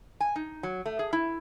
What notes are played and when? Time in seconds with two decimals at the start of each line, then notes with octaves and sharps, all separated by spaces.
0.20 G#5
0.36 D#4
0.63 F#3
0.86 A3
0.99 G#4
1.13 E4